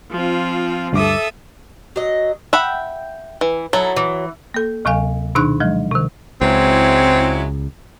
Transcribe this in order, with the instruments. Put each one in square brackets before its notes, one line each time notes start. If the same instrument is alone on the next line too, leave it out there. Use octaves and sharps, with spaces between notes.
[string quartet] F3 C4 F4
[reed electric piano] D2 G2 D6 [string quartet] A4 E5 D#6
[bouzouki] F#3 D#5
[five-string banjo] E5 F#5 B5 [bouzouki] G5
[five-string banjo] E3
[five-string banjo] F#3 [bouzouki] D#4 E4 A4
[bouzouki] E3
[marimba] A#3 A4
D2 C3 F#3 F5 G#5
B2 D#3 D4 D#4 C#6 F#6
F3 F#3 G#3
C3 D#3
[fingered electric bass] C#2 [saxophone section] F#3 G#3 E4 [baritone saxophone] C4